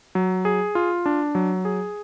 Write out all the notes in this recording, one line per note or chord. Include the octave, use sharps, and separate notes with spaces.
F#3
G#4
F4
D4
F#3
G#4